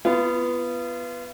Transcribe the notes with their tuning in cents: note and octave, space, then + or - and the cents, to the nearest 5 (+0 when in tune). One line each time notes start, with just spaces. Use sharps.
B3 +0 F4 -35